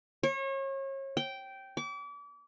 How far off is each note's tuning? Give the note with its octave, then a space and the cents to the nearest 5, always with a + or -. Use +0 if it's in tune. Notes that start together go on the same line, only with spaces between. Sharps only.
C#5 -35
G5 -10
D6 -35